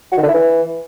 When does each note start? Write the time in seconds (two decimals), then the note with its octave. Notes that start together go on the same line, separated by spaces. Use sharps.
0.12 F#4
0.18 D#3
0.23 D3
0.28 E4
0.34 E3